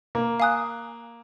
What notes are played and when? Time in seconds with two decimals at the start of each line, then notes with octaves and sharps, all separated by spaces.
0.15 A#3
0.40 F5 G#5 D#6 F#6